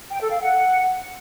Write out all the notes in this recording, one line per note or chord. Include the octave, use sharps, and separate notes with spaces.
G5
A4
F5
F#5